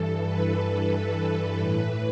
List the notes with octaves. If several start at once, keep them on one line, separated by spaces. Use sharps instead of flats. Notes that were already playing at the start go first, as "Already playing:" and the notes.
Already playing: G2 E3 A4
B4
A4
A2 E3 B4